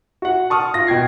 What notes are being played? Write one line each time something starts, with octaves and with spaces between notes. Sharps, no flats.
F#4 F#5
A5 C#6 D#6 F6
F4 A#6
B2 G5 G#6 C7